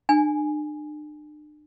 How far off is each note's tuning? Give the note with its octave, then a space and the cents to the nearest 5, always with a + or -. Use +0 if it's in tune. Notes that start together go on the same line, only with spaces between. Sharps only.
D4 +40 G#5 +0